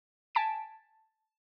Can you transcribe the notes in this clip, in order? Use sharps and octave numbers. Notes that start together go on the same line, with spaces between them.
G#5 A5 B6 D7